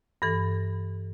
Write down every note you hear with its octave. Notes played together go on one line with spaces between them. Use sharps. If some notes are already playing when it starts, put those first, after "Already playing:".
G2 E3 A4